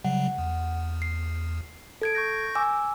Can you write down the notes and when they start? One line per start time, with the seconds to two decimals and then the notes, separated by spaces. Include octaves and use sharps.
0.04 C#3 F#3 G3 F#5
0.38 E2
1.02 C7
2.02 A4 G#6 D7
2.15 C#6 G6 A#6
2.55 G#5 D6 E6